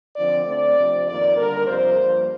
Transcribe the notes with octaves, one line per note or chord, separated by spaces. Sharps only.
D3 F3 C4 D5
D3 A3 C4 D5
C3 F3 C4
F2 D#3 A#3 D5
D3 G3 A#3 A#4
F2 C3 G3 A#3 C5
G2 F3 A#3